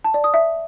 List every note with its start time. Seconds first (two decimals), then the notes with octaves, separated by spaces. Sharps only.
0.04 A5
0.14 D5
0.24 D#6
0.34 E5